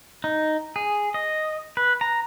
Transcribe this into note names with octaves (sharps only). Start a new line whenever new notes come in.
D#4
G#4
D#5
B4
A#5